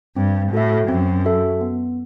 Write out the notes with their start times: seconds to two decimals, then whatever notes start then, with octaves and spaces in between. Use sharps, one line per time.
0.16 G2 C4
0.52 A2 F#4 A4 E5
0.88 F#2 C4
1.25 F#4 A4 E5
1.61 B3